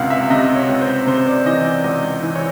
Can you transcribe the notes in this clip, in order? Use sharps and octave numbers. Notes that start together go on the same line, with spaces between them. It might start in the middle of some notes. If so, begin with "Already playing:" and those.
Already playing: C#2 C3 F5 F#5
E5
C3 D#5
C#5
C#2
C5
C3 C5
D5
E3 D#5
D5
C#2 D#5
E3
C#5